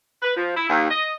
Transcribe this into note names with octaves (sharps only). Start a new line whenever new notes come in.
B4
F3
E4
D#2
D#5